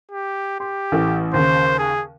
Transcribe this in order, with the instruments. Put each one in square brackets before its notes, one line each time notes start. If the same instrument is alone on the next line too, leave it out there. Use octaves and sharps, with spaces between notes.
[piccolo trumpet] G4
[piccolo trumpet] G4 [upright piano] C6
[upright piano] A1 E3 A3
[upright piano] D#2 C#3 [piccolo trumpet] C5
[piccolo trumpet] G#4